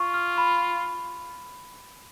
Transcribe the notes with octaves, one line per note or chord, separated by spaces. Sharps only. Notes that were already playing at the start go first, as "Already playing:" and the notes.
Already playing: F4 C#6
F6
B5